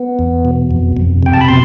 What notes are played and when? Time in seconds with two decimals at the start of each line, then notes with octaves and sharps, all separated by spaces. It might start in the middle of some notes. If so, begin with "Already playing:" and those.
Already playing: B3
0.19 E2
0.45 B2
0.71 F2
0.97 F2
1.23 C3 G5
1.34 A5
1.41 B5
1.48 B2 C6